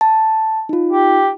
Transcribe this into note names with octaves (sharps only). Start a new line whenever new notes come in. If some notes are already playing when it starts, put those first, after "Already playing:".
A5
D#4 F4
G4